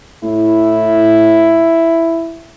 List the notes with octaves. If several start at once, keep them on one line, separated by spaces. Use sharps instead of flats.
A2 E4